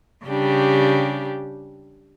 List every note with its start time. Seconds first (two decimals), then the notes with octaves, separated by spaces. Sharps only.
0.25 C#3 G3 D4 G4